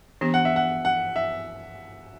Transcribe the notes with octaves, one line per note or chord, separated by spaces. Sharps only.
E3 B3 D4 G4
F#5
E5
F#5
F#5
E5